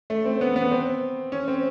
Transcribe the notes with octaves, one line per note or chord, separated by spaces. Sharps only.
A3
C4
B3
B3
C4
C#4
C4